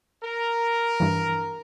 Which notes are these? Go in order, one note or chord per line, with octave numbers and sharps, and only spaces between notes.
A#4
G2 E3